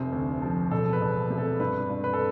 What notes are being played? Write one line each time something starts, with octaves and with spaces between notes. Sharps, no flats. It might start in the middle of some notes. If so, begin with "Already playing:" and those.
Already playing: F1 C3 C4
D2
F3
E1 A4
B4
E1
C3
A4
G2 B4
G2
B4
A4